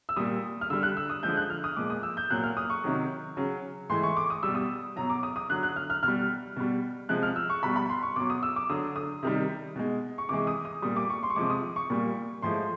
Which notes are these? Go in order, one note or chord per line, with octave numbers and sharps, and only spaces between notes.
E6
A#2 G3 D#6
F6
D3 G3 E6
F#6
E6
D#6
D3 F3 G#3 G6
F#6
F6
D#6
A#2 F3 G#3 D6
D#6
E6
G6
A#2 F#3 F#6
F6
D#6
C#6
C3 D#3 F#3
C#3 F#3
A2 E3 G#3 C6
C#6
D6
D#6
B2 G3 E6
D#6
B2 F#3 A#5
D6
D#6
D#6
D3 F#3 F#6
F#6
F6
F6
B2 G3 F6
B2 G3
C3 F3 G#3 F#6
F6
E6
C#6
B2 G3 B5
B5
C6
C#6
B2 F#3 D6
D#6
E6
D6
D3 F#3 D#6
D#6
C3 D#3 G3
B2 G#3
C#6
C3 E3 G#3 D6
D#6
D#6
A#2 G3 D#6
D6
C#6
C6
C#6
C3 F3 G#3 D6
D#6
C#6
A#2 G3
A2 F3 G#3 C6